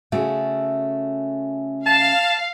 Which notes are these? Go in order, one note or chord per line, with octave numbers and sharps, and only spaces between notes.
C#3 A3 F#4
F5 A5